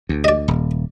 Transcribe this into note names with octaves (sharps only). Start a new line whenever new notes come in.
D2
D5 D#5
D#1